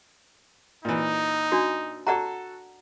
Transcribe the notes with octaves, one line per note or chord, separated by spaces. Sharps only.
A#2 E3 D#4
D4 F#4
F#4 A4 D5 F#5 A#5